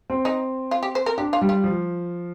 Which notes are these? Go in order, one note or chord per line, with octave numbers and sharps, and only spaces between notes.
C4
D#4
F4
G4
C5
A#4
D4 G4
F4
G3
F4
F3